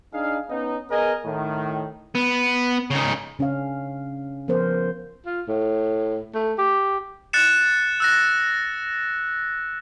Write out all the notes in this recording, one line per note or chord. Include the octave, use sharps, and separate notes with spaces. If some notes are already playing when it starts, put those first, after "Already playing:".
D4 D#4 G#4 F5
B3 C#4 D#4
B3 G#4 A#4 D#5 G#5
A2 D#3
B3
C#3 D#4
C#3 C#4 D4 F5
F3 B3 C#4 A#4 C5
F4
A2
A3
G4
F#6 A6 C#7 E7
E6 F#6 A#6